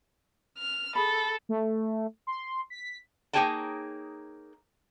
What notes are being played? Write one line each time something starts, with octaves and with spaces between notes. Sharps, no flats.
F6
G#4 A4 B5
A3
C6
B6
A#3 D#4 G#4 C#5 G5 A5